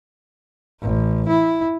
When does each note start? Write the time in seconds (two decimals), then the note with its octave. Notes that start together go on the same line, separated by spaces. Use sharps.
0.82 A1
1.28 E4